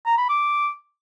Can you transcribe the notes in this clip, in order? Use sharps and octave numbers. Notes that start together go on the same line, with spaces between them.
A#5
B5
D6